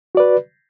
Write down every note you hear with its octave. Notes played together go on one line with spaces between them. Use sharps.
F#4 B4 D5